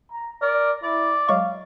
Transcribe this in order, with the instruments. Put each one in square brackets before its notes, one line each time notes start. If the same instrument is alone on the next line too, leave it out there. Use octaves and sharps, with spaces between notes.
[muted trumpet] A#5
[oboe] A#4 [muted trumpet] D5
[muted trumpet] E4 [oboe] D5
[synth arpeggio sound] F#3 G#3 C#6 [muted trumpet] F5